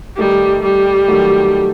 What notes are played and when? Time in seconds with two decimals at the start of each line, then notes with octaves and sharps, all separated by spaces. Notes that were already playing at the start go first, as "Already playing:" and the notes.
0.17 D#3 G3 A3 D#4
0.63 G3
1.08 D#3 F#3 A3